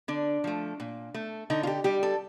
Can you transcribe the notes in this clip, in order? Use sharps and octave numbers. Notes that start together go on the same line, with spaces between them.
D3 D4
F3 A3
A#2
A3
D3 D#4
F4
G4
G3 G4
A4